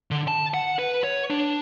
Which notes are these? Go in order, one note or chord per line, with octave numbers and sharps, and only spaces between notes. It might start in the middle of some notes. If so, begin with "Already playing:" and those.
D3
A5
F#5
B4
C#5
D4